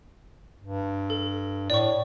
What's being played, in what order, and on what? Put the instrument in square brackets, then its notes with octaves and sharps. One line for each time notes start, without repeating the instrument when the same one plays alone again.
[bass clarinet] G2
[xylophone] A4
[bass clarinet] A2 [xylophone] D5 C#6